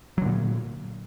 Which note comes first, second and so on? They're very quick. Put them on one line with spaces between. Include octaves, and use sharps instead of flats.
F#3 D3 A#2